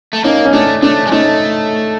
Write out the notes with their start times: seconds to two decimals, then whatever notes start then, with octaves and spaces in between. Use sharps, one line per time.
0.13 A3
0.24 A#3 C#4 D#4
0.45 C#4
0.53 A3 D4
0.82 A3 D4
1.07 G#3
1.11 A3 C#4 D#4